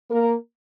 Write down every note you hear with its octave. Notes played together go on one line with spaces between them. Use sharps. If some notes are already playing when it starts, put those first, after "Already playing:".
A#3 A#4